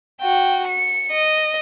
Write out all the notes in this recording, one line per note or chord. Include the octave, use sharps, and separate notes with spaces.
F#4 G5
C#7
D#5